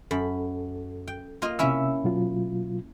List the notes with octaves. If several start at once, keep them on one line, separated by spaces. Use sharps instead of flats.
F#2 A4 B5
G5
A#3 F4 D#5
C3 C#4 E4 E5 E6
B2 F#3 F4